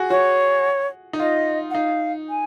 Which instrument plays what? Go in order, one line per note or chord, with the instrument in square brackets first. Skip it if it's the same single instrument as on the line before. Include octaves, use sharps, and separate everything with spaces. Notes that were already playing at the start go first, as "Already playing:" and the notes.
Already playing: [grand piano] F#4 G#4
[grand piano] F#4 [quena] C#5
[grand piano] D#4
[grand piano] F4 [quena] D#5
[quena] F#5
[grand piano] D#4 [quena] F5
[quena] G#5